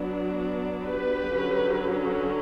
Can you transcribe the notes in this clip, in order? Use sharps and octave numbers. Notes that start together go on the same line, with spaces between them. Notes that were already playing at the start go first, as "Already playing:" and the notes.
Already playing: F#3 B3 D4
G4 B4
D3 F#3 C#4